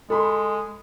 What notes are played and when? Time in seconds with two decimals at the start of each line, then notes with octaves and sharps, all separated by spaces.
0.10 G#3 A4 B5 C6